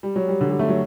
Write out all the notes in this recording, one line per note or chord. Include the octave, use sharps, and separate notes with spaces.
G3
F#3
G3
D3
G3
A3
F#3